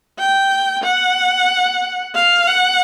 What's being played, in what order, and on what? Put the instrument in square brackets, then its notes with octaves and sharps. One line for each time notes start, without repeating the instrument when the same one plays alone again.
[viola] G5
F#5
F5
F#5